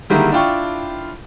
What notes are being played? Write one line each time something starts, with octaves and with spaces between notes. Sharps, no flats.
D3 D#3 G3 G#3 A#3 E4
D4 E4 F4 G5 C#6